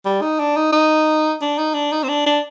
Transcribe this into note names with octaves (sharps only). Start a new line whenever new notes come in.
G3
D#4
D4
D#4
D#4
D4
D#4
D4
D#4
C4
D4
D4